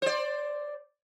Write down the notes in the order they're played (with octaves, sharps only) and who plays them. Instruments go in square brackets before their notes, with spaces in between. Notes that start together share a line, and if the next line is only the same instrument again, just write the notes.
[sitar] C5 D5